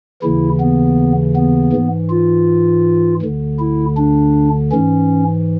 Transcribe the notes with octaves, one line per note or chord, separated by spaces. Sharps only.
D#2 C#3 E3 E4
B3
B3
G#2 E3
F4
D2 D3
E4
D4
G#2 E3 C#4